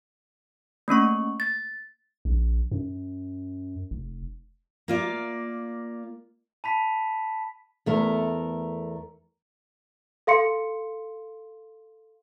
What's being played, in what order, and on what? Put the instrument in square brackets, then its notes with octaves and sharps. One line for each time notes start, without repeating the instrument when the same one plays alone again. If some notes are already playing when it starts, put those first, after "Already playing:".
[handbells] A3 A#3 C#4 C#6
A6
[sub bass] A#1
F#2
F1
[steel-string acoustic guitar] A#3 F4 D5
[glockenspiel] A5 B5 B6
[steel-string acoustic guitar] E2 A3 A#4
[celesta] A4 F5 C6 C#7